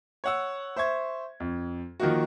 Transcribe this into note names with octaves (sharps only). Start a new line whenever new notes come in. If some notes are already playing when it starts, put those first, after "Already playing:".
C#5 F#5 E6
C5 E5 C#6 G#6
F2
D#3 F3 A#3 D#4 F#4